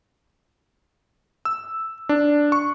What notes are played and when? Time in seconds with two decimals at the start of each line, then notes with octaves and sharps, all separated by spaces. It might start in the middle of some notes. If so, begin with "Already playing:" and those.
1.45 E6
2.09 D4
2.52 C#6